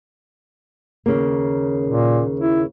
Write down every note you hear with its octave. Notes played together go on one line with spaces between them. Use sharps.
D#2 C#3 A#3
A#2
E4